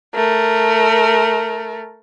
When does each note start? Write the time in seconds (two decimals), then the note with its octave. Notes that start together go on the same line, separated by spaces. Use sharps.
0.14 A3 A#4